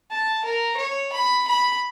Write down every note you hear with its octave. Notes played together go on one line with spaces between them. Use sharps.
A5
A#4
C#5
B5
B5